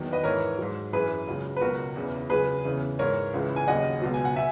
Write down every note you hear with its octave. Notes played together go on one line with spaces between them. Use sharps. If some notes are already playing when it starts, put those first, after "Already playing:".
Already playing: E2 D#3 F#3
B4 D#5
G#2 E3 A#4 C#5
G#2 F#3
F#2 E3 G#4 B4
C#2 C#3 F#3
B4
C#2 B2 F#3 F#4 A#4
E2 C#3 E3
C#2 C#3 F#3 G#4 B4
E2 C#3 E3
G#2 E3 A#4 C#5
C#2 C#3 E3
G#5
D#2 C#3 F#3 D#5 F#5
C#2 B2 F#3
G#5
F#5
E5 G#5